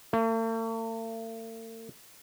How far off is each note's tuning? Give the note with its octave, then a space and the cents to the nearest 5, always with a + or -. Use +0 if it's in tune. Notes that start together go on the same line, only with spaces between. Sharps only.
A3 +45